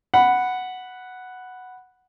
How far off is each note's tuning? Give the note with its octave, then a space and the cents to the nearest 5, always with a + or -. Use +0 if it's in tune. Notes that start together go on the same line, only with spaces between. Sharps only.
F#5 +0 B5 +0